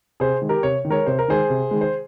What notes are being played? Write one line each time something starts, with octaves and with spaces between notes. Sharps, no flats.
C3 G#4 C5
D#3 G#3
G4 A#4
C3 C#5
D#3
G#3 A#4 C#5
C3 C5
A#4
D#3 G#3 G#4 C5
C3
D#3 G#3
C5